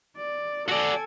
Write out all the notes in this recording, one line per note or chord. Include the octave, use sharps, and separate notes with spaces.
D5
F#4 A4 D5 G#5